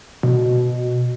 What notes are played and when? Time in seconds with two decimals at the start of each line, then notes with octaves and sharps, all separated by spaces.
0.23 B2